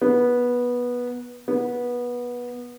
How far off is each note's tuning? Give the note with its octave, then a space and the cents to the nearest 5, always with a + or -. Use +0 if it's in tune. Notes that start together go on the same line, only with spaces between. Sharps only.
B3 -15
B3 -20